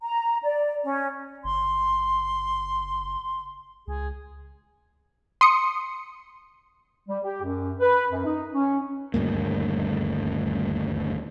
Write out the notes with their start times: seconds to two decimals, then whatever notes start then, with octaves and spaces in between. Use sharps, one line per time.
0.01 A#5
0.44 D5
0.84 C#4
1.44 F#1 C6
3.87 C#2 G#4
5.41 C6 D#6 C#7
7.08 G3
7.23 G4
7.42 F#2
7.79 B4
8.10 F#2
8.24 D#4
8.53 C#4
9.14 D#1 D2 G2 A#3